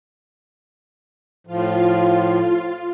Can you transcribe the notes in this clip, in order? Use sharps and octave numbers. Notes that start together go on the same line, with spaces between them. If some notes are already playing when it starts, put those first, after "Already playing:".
A2 F3 F4